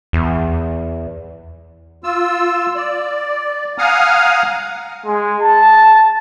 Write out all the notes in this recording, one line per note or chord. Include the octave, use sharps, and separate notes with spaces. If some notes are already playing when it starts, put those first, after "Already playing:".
E2
F4 E6
D5
F5 F#5 G#5 A#5 D#6 F6
G#3
A5